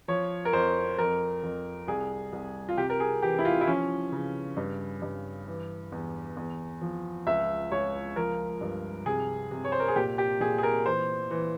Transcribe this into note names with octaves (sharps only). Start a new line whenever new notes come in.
F3 C#5
A#4
F2 C5
F2 A#4
F2
C2 G#4
C2
F4
C3 G4
A#4
G#4
E3 G4
E4
F4
E4
F3 C#4
C#3
G2
G2
E3
E2
E2
F3
C#2 E5
C#2 C#5
F3 A#4
G2
C3 G#4
C3
C#5
C5
A#4
G#4
A#2 G4
G4
A#2 G#4
G#4
A#4
E3 C5
E3